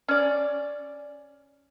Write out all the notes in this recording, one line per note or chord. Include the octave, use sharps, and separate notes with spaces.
C#4 D5